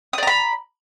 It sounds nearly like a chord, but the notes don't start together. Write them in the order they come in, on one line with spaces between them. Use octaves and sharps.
D#6 D5 A#5 B5